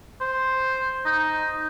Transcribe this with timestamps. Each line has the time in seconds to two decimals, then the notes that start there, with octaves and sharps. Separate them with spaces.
0.21 C5
1.06 D#4